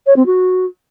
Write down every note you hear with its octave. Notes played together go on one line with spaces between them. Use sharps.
C#5
C4
F#4